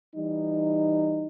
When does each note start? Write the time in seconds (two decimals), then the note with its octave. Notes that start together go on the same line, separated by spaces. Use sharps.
0.14 E3 G3 D#4